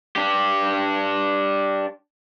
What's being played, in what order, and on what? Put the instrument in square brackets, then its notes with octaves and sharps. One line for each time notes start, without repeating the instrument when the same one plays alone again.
[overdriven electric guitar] D4 G4